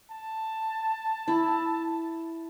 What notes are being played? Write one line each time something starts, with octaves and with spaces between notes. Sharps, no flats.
A5
E4